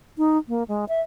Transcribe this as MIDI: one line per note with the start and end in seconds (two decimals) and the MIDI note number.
0.18 0.38 63
0.48 0.64 58
0.68 0.85 56
0.89 1.01 76